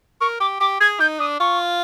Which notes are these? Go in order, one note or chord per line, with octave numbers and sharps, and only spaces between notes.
A#4 C#6
G4 D6
G4 D6
G#4 G#6
D#4 G6
D4 D#6
F4 C#6